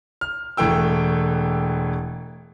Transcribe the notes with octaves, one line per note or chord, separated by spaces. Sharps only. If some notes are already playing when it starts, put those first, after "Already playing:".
F6
E1 E3 A3 G5 E6